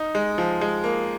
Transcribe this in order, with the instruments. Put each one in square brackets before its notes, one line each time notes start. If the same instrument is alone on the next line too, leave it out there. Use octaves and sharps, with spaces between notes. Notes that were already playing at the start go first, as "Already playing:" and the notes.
Already playing: [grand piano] D#4
G#3
F3
G#3
A#3